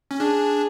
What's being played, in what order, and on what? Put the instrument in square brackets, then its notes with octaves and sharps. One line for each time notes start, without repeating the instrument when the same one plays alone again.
[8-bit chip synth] C#4
[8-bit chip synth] D4 [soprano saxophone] G#4